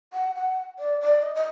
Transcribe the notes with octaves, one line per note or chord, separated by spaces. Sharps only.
F#5
F#5
D5
D5
D#5
D#5